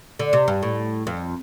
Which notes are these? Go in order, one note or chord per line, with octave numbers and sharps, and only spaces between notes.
D3
C3
G2
A2
F2